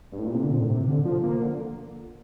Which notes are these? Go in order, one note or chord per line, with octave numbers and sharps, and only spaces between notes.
G2
A2
A#2
C3
D3
A#2
A2
C3
D3
F3
A#3
D3